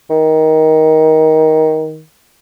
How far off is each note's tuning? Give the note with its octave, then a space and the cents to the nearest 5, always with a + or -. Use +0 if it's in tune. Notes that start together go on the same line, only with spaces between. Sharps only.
D#3 +15